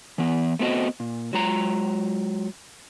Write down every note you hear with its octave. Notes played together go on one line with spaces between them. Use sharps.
E3 B3
A3 B3 C4 F#4 D#5
A#2
F#3 G#3 F4 A#5